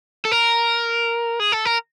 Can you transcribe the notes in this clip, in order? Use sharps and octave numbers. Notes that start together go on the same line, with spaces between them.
A4
A#4
G#4
A4
A#4